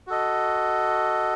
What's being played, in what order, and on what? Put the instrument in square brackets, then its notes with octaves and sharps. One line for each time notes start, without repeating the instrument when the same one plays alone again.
[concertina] F#4 A4 D#5